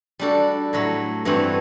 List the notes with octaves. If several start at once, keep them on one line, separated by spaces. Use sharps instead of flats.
G3 D4 F#4 A4
A2 F#3 A3
G2 E3 A3 C4 F#4